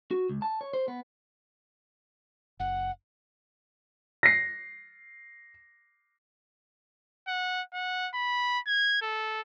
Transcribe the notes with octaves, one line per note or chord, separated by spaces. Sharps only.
F#4
C#2
A5
C#5
C5
B3
F#1 F#5
A#6 C7
F#5
F#5
B5
G#6
A4